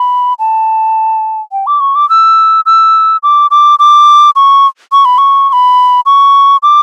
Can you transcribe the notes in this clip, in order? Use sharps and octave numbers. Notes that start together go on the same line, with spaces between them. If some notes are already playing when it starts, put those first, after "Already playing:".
Already playing: B5
A5
G5
D6
C#6
D6
E6
E6
D6
D6
D6
C#6
C#6
B5
C#6
C#6
B5
C#6
D6